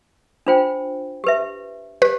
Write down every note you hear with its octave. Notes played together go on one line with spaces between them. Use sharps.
D4 F4 C5 G5
G4 B4 E5
G4 B4